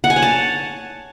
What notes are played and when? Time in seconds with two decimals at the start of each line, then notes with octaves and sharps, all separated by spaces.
0.04 F#5
0.10 G#5
0.16 C#5
0.22 A5